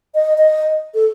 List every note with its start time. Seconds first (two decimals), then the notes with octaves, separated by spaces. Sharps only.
0.15 D#5
0.38 D#5
0.95 A4